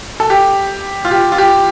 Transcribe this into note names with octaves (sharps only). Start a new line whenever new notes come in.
A4
G4
F4
G4
F4
G4